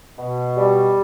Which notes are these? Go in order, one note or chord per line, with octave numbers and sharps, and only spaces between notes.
B2
G3